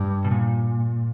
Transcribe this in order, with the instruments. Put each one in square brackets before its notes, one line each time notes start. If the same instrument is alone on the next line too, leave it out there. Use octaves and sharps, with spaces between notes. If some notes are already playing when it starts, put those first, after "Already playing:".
Already playing: [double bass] G2
[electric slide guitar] B2
A#2